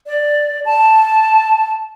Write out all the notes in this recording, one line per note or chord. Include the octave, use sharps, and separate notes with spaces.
D5
A5